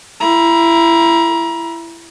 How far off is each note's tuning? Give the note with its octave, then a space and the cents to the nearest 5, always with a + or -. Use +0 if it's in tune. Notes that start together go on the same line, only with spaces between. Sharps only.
E4 +25 A#5 +30